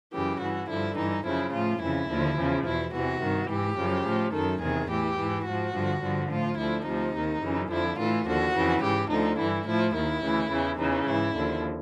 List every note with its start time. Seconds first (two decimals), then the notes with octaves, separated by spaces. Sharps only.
0.13 F#2 C#3 E3 G4
0.41 G2 E3 F#4
0.69 G2 D3 F3 E4
0.97 G2 E3 D#4
1.25 F#2 C#3 F3 E4
1.53 A2 F3 F4
1.81 F2 C#3 E3 E4
2.09 D#2 D3 F3
2.37 E2 C#3 F3
2.66 E2 B2 E4
2.93 E2 C3 E3 F#4
3.22 G2 D#3
3.49 G#2 E3 G4
3.78 F#2 C#3 F3
4.06 A2 F3
4.33 F#2 D#3 A4
4.61 E2 C3 D#3 G#4
4.89 A2 E3 G4
5.18 G#2 E3
5.46 G#2 F#4
5.51 F3
5.74 G2 D3 F3
6.02 G2 D3 F3
6.30 A2 F3 F4
6.58 D2 D3 F3 E4
6.86 D2 C3 F3 D#4
7.15 D#2 D#3
7.43 F#2 C#3 E3
7.71 F2 D3 F3 E4
7.98 A2 E3 F4
8.27 D#2 D3 F3 F#4
8.54 F2 C#3 E3
8.83 G#2 E3 G4
9.10 D2 D3 F3 D#4
9.39 G2 E3 E4
9.67 A2 F3 E4
9.94 D#2 D#3 E4
10.23 D2 C#3 E3
10.51 E2 C#3 E3
10.79 E2 C#3 E3 D#4
11.07 G#2 E3 E4
11.35 D#2 D3 F3